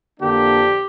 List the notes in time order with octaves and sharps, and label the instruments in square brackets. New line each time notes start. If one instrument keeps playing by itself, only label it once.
[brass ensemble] F2 D3 A#3 D4 G4